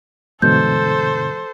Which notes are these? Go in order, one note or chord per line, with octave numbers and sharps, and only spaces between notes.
G2 B2 D3 E3 G#3 A4 C5 G6